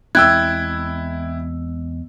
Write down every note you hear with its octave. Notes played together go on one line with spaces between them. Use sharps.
E2 G#3 C4 E4 G5 E6 F#6 G#6